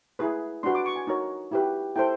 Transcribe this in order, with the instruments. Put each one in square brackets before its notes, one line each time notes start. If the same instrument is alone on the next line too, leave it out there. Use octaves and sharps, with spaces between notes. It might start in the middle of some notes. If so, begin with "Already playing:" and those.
[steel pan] E4 G#4 B4
D4 F#4 B4 C6
D6
C#6
G#5
D#4 F#4 A#4 C#5
E4 G4 B4
E4 A4 C5 G5